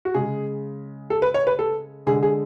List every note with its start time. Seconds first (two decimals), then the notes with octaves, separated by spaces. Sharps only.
0.05 F#4
0.14 C#3 G#3 G#4
1.10 A4
1.22 B4
1.34 C#5
1.47 B4
1.59 A4
2.06 D3 G#3 G#4
2.23 G#4